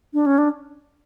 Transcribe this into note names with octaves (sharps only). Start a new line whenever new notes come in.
D4
C#4
D4